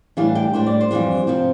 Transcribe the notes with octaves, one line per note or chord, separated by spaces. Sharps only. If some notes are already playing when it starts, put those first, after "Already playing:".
A2 E3 G3 D4 F5
G5
A2 G3 D4 C5
D5
C5
F2 E3 G3 D4
C3 F3 C4